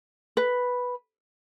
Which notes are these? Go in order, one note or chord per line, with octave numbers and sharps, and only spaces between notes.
B4